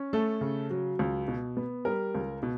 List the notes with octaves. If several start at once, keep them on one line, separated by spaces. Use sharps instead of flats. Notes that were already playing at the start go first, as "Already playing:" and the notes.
Already playing: C#4
A3 A4
C#3
F#3
C#2
B2
B3
G3 A#4
C#2
B2